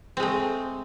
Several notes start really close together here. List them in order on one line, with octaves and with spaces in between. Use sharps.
C4 G#3 A3